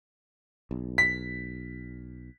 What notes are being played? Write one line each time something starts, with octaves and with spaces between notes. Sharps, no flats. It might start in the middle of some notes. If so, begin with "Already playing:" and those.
B1
B6